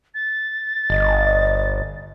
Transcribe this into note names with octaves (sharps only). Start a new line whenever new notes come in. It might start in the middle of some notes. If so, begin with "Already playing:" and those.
A6
G1 D#5